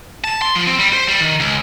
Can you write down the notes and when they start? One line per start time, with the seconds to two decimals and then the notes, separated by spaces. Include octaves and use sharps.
0.24 A5
0.42 C6
0.55 F3
0.67 C4
0.79 G3
0.93 C5
1.08 G3
1.20 D#3
1.40 C#2